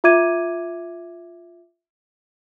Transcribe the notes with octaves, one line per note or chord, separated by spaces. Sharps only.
F4 E5 D6 G#6 D#7